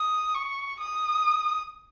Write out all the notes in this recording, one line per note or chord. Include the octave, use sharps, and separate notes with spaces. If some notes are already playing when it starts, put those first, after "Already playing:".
Already playing: D#6
C#6
D#6